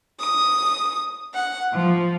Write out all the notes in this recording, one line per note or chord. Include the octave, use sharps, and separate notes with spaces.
D#6
F#5
F3